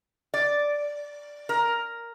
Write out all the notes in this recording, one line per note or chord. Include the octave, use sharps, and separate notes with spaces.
D5
A#4